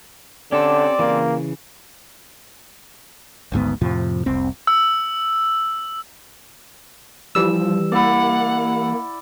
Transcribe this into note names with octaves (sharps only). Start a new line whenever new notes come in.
D3 C4 C#4 G4 A4 D5
C#3 E3 A#3
G#1 D2 G#2 B3
F2 A2 C3 F3
F1 C2 C4
E6
E3 F3 G3 E6
A#3 E4 D5 F#5